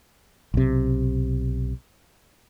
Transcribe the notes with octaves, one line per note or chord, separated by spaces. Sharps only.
B1 C3